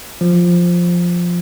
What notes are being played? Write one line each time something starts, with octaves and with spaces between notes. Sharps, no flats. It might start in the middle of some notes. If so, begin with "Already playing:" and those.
F3